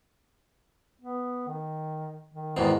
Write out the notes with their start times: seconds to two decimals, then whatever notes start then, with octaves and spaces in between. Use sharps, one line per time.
1.01 B3
1.48 D#3
2.34 D#3
2.57 E2 G#2 B2 D#3